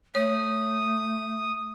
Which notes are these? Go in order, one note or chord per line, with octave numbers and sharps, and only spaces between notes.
A3 C#5 D#6